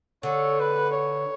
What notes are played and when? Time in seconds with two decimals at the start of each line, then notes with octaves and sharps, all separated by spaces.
0.23 D3 C#5
0.60 B4
0.96 C#5